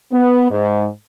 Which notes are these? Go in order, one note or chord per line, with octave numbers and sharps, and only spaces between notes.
B3
G#2